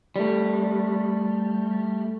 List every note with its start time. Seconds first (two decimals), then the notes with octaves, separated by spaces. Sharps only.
0.16 G3 A3